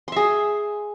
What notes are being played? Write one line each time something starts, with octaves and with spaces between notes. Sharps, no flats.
G#4 E5 C6